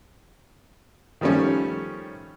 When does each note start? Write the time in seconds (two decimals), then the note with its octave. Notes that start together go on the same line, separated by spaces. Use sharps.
1.21 D#3 F3 G3 A3 C#4